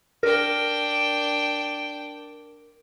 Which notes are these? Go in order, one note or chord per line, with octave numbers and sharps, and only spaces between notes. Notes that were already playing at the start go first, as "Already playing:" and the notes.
D4 A#4 G5